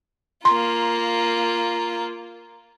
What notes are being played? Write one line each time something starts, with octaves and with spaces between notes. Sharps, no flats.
A#3 F4 A#5 C6